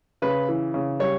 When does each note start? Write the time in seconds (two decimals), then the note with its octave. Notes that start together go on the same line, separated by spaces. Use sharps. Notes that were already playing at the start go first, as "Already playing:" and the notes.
0.22 C#3 B4
0.49 E3
0.74 C#3
0.99 G3 C#5